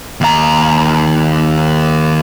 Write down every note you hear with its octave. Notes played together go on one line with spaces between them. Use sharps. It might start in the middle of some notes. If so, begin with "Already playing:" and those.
D#2 A#5